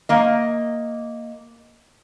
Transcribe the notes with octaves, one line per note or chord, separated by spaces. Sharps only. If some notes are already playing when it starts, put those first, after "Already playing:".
A#3 D#5